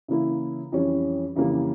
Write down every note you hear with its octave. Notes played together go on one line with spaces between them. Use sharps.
C#3 E3 A#3 E4
F2 E3 G3 C#4
F2 C#3 E3 G3 A#3